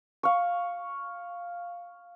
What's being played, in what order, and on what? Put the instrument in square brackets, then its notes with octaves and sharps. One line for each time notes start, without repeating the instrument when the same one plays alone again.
[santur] F5 C#6